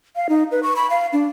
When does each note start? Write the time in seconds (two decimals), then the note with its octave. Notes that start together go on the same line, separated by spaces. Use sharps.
0.16 F5
0.29 D#4
0.52 B4
0.63 C#6
0.76 B5
0.90 F5
1.13 D4